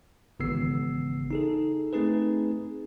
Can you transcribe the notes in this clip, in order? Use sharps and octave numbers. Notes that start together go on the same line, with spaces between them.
G#1 C#3 E3 B3 E6 C7
D#4 G#4 A4
A3 C4 D#4 G#4 B4